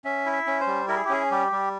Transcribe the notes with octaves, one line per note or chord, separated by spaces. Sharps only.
C#4 E5
E4
E5
C#4
C5
G3
E4 A#4
G#4
G4
C#4 G#4
G3 G4
G3